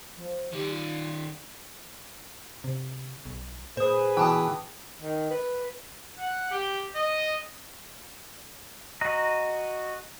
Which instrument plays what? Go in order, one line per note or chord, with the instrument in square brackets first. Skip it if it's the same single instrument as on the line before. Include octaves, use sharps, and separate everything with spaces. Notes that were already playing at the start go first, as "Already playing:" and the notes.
[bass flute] F3
[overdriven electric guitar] D#3 D5 [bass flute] G4
[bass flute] F4
[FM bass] C3
B1
[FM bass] A#2 [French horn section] G#4 B4 [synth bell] C5 D#6
[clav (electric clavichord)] B2 E3 [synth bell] G5 A5 D#6
[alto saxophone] D#3
B4
[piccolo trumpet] F#5
G4
D#5
[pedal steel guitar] F#4 D#5 A#5